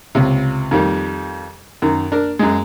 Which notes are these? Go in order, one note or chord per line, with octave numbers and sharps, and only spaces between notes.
C#2 C3
F2 D#3 G3
F#2 D#3
D4 A#4
F#2 G#3